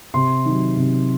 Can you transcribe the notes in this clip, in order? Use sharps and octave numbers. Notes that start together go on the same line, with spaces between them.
C3 C6
D#3 F#3
C3